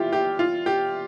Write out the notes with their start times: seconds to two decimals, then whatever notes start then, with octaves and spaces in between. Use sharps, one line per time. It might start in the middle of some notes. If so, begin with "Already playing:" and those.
Already playing: E3 G3 E4 F4 G4
0.13 G4
0.39 F4
0.66 G4